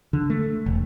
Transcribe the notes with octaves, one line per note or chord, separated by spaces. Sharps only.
D3
A3
E1